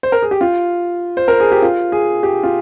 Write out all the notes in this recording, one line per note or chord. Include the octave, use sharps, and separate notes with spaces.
C5
A#4
G#4
G4
F4
C5
A#4
G#4
G4
F4
G#4
G4
F4